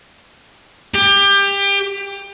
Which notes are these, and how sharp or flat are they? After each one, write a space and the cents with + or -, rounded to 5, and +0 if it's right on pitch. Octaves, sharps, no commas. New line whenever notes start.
G4 +25